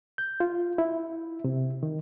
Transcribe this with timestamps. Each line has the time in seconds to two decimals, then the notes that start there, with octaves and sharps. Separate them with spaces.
0.18 G6
0.40 F4
0.78 E4
1.44 C3
1.83 D#3